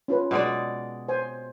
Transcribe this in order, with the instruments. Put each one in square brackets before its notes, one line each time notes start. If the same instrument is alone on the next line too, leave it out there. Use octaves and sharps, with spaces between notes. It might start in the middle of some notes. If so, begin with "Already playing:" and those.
[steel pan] C#4 F4 B4
[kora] B2 G#3 D5
[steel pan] C5 G#5